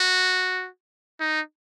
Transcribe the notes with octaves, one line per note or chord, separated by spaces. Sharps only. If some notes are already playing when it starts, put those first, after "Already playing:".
Already playing: F#4
D#4